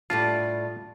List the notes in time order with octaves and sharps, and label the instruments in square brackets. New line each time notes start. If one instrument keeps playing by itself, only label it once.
[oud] A2 G3 D4 [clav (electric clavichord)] F4